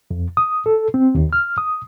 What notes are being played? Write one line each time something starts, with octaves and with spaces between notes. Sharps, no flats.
F2
D#6
A4
C4
D#2
F6
D#6